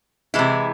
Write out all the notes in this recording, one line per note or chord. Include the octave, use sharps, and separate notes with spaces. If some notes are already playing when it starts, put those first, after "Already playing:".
C3 E3 G#3 E4